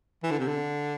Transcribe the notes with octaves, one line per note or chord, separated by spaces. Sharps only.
E3
D3
C3
D3